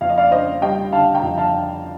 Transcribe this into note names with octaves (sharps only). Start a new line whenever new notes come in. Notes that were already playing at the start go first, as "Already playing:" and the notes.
F2 F5
D#5
D5 F5
D4 C5 D#5
G3 D#5 G5
D3 F5 A5
G5 A#5
F2
F5 A5
D4